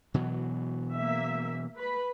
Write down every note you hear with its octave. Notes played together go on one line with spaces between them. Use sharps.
B2 E3 F#3
A#3 E5
B4 B5